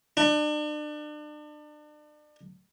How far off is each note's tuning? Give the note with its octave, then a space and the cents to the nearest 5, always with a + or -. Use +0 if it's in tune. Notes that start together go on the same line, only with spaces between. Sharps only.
D4 +35